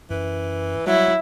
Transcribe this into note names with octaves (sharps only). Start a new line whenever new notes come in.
F#2 E3
F#3 G3 E4